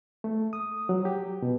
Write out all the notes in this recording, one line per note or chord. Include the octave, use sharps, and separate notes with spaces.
A3
D#6
F#3
G4
B2